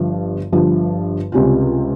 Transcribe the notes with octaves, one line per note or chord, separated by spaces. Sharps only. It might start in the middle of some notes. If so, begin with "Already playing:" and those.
Already playing: G1 G2 F3
G1 G2 F3
C#2 C3 G3 C#4 F4